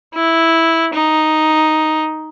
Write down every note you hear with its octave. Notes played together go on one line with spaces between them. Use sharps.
E4
D#4